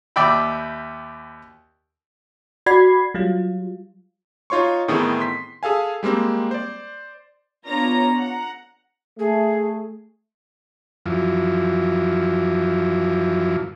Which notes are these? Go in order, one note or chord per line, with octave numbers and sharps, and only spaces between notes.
D#2 D5 E5 G5 B5
F#4 D5 B5 G#6 C7
F#3 G3 F4
D#4 F4 C#5 C6 C#6
A2 D#3 E3 B3 C4 G#4
C6 B6
G#4 A4 F5 G#5
G3 G#3 A#3 C4
C5 D5
B3 D4 F4 C#5 A#5
F#5 A#5
A3 G#4
F#2 E3 F3